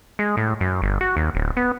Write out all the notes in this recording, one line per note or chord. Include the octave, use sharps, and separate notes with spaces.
G#3
A2
F#2
G1
F#4
D#2
D1
B3